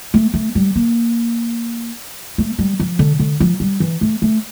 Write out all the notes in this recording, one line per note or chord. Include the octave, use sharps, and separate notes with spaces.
A3
A3
G3
A#3
A3
G3
F3
D3
D3
F3
G3
E3
A3
A3